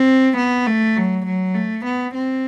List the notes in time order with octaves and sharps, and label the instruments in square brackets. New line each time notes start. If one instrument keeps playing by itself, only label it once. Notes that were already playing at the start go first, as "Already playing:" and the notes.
Already playing: [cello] C4
B3
A3
F#3
F#3
A3
B3
C4